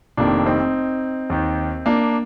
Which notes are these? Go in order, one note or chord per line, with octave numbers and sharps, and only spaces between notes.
F1 F2 D#3 A#3 D4
C4 D#4
D#2 D#3
A#3 D4